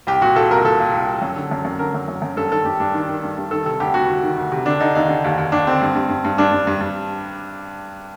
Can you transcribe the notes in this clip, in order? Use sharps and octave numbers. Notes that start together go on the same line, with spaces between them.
C2 G4
A#2 F#4
A#2 A4
C2 A#4
A#2 A4
A#2
C2
C2
F#2
D3
F#2
F#2
D3 A#4
F#2
F#2
F#2
G2 A4
D#3 A4
G2 G4
G2 D4
D#3
D#3
G2
G2
D#3 A4
C3 A4
D2 G4
D2 F#4
D2
D#3
D2
C3
D3 D4
D3 D#4
D#2 D#4
D3
D#2
D#2
D#2 D4
D3 C4
G2
G2
G2
G2
G2 D4
G2
G2
G2